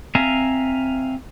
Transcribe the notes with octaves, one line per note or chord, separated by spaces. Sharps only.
C4 E5 F5 G#5 A#5